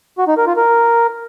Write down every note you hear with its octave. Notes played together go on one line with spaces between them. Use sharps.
F#4
D#4
A#4
F4
A#4